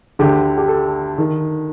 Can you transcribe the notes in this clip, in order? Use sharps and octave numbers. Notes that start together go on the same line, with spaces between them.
D2 D3 G4
G4
A4
D#3